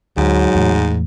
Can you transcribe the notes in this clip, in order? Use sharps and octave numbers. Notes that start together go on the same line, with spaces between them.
D2 G#2 F#3
E2 A2 A3